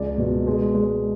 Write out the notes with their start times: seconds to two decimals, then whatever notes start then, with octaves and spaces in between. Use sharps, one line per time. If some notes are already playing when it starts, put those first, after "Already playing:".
Already playing: C#2 G#3 D5
0.18 B2
0.47 G#3
0.75 G#3